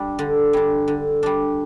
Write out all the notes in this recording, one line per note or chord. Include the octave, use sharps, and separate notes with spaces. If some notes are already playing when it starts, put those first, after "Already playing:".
Already playing: G3 D4
D3
G3 D4
D3
G3 D4